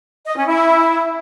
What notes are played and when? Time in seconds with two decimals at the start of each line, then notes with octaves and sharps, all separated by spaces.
0.25 D#5
0.36 C#4
0.47 E4